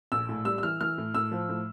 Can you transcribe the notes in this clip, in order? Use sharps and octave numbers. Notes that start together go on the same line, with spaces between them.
A#1 E6
A2
G3 E6
E6
E3 F6
E3 F6
A2
A2 E6
F3
A2